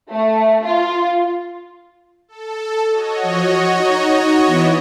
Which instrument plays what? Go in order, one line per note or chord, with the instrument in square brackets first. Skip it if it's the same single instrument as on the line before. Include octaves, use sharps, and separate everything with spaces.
[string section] A3
F4
[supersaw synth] A4
F#4 C#5 D#5
[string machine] F3
D#4 A#5
E3 B3 E4